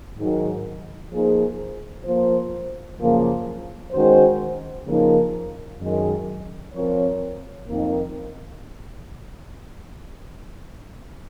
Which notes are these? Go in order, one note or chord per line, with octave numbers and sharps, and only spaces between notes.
G#2 D#3 F#3
F3 A#3 D#4 G#4 C5
F3 A#3 F4 C5
F#2 C#3 F3 A#3
D#3 G#3 C#4 F#4 C5
C#3 F3 A#3 D#4 A#4
F#2 D#3 G#3
F3 C4 F4 A#4 C#5
F2 D#3 A#3